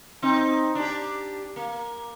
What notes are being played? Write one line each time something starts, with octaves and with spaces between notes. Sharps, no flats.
C4 D#4
D4 G4
A#3